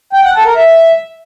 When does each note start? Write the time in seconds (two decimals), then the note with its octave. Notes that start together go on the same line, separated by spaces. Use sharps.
0.13 G5
0.24 F#5
0.34 A4
0.45 A#4
0.55 E5